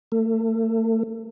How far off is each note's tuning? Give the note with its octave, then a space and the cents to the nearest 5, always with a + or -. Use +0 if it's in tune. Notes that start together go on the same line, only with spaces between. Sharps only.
A3 +35